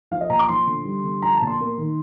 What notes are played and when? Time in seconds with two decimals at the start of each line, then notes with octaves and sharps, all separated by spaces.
0.11 F3 F5
0.21 D#5
0.30 A#2 A#5
0.39 D6
0.49 F3 C6
0.67 D3
0.85 G3
1.04 D3
1.22 F3 A#5
1.36 A5
1.42 A#2
1.47 C6
1.60 A#3
1.78 D#3